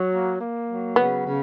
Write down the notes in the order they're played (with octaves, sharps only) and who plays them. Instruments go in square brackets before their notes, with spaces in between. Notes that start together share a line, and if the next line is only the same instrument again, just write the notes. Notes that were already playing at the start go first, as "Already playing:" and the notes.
Already playing: [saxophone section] F#3
A#3
A#3
F#3
[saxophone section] C#3 [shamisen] B3
[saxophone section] C#3